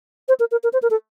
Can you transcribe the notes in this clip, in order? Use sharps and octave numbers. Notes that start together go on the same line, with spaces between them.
C5
A#4
A#4
A#4
C5
A#4
A4